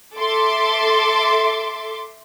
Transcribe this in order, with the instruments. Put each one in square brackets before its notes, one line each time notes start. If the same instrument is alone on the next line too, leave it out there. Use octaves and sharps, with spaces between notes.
[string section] A4 E5 C6 D6